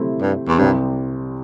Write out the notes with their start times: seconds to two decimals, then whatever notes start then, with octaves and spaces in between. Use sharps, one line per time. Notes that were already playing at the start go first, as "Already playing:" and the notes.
Already playing: C3 A3 C4 E4
0.21 G2
0.48 E2
0.59 C2 G2 C3 G3 C4